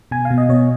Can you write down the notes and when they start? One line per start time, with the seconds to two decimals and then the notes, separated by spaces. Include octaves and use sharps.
0.11 B2 G#5
0.25 F5
0.31 B2
0.38 D#5
0.49 B2 C#5